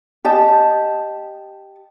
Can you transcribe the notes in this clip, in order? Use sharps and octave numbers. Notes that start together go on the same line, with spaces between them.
G4 D#5 A5